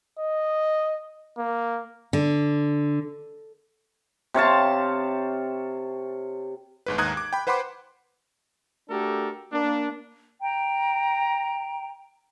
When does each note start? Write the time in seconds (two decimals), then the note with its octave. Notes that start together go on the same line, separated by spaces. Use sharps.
0.19 D#5
1.38 A#3
2.13 D3
4.34 C3 C#5 F5 A5
6.86 G1 G#2 B4
6.98 D#2 G#2 A#5 D#6 F#6 G#6
7.17 D6
7.33 G5 B5
7.47 B4 C5 F#5 B5 C6 D6
8.89 A3 D4 F#4 G4 A4 A#4
9.52 A#3 D4
10.41 G5 A#5